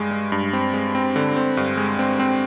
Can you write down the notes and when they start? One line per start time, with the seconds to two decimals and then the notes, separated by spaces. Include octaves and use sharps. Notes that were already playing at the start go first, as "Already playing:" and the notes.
Already playing: G2 G#3
0.11 G#3
0.32 G2
0.53 C4
0.74 G#3
0.95 C4
1.16 D3
1.36 C4
1.57 G2
1.77 G#3
1.99 C4
2.19 C4